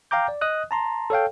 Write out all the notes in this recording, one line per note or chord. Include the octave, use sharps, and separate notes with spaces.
F5 G5 A#5 D6 G6
D5
D#5 D#6 F#6
A5 A#5 C6
A4 C#5 F5 G5